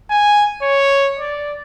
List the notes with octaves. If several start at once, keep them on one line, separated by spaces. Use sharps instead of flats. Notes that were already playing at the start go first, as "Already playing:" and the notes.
G#5
C#5
D5